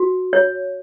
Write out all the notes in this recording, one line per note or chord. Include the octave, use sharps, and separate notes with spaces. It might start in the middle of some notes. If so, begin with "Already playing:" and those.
Already playing: F#4
C#5